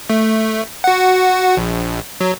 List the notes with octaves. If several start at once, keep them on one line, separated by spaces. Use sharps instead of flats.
A3
F#4 F#5
A#1
F#3